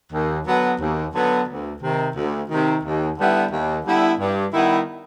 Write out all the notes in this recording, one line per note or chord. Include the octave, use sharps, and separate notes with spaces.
D#2
D3 F#3 B3
D#2
D3 F#3 B3
D2
C3 D#3
D2
C3 D#3
D#2
D3 G3 B3 E4
D#2
D3 G3 B3 E4
G2
D#3 G3 B3 E4